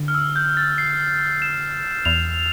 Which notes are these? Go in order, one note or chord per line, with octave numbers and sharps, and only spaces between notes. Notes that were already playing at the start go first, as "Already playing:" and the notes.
Already playing: D3
F6
E6
G6
A6
C7
E7
E2 F7